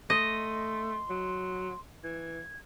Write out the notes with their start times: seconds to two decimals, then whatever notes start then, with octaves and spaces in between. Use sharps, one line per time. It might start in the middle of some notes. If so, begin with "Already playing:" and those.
0.10 A3 D#5 C6
1.10 F#3
2.03 E3 G#6